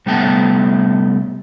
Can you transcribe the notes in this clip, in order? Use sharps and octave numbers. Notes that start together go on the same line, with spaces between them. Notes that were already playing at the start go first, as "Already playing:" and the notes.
C3 G3 A3 B3 G5 A5